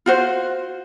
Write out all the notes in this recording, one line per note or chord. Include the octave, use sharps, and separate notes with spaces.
F4 F#4 C5